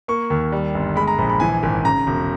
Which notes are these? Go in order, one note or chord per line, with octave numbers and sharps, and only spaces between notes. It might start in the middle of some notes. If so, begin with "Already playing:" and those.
A#3 C#6
D#2
G3
G1
G#3 B5
A#5
A#1 B5
B5
E3 G#5
G#1
C#3 A#5
E1